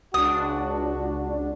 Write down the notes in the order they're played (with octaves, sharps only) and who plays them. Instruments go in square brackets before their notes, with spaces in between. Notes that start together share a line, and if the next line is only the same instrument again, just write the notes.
[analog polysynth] C#2 D4 [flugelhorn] F#4 [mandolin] D#6